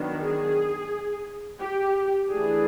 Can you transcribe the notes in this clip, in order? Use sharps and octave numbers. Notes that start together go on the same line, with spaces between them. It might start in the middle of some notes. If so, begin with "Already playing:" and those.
Already playing: D#3 F#3 B3 D4
G#4
G4
E3 A3 D4 G#4